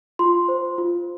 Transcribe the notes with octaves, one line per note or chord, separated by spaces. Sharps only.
F4 C6
C5
F4